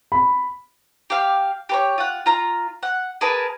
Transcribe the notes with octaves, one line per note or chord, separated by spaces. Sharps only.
B5
G4 F5
G4 B4 C#5
F4 F#5
F4 A#5
F#5
G#4 A#4 B4 A5